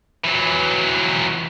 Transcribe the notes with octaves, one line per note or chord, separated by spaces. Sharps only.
E3 F#3